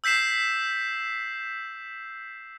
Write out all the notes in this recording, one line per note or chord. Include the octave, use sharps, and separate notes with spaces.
E6 G6 B6 C7 E7